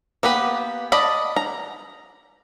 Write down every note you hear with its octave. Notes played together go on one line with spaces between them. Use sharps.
A#3 B3 G4 B4
D5 D#5 A5 B5
A#5